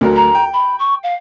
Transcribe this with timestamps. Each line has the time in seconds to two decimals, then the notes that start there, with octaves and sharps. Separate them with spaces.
0.01 D2 F#3 A#4
0.15 A#5
0.35 G5
0.53 B5
0.78 C#6
1.03 F5